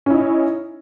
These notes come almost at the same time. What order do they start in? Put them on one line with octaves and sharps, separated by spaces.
C#4 E4 D#4